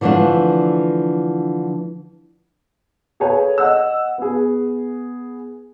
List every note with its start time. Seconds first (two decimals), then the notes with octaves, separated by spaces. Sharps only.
0.01 D3 E3 F3 A3 D4
3.20 G#4 A4 B4 C#5 F5 G#5
3.58 D#5 F#5 E6
4.18 B3 G#4